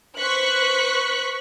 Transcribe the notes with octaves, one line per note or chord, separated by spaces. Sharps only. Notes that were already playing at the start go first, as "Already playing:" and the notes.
B4 C5 C#6 F#6 B6